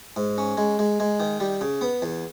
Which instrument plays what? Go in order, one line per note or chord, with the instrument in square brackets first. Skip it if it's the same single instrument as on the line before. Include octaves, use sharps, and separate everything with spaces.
[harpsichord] G#2
C#4
G#3
G#3
G#3
D#3
G3
C#3
B3
E2